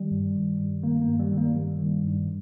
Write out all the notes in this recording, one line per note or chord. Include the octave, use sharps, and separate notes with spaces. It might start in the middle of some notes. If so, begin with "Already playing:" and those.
Already playing: D#3 G3
G2
D#3
G2
D#3 A#3
A#3
G2
G3
D#3
A#3
G2 G3
D#3
G2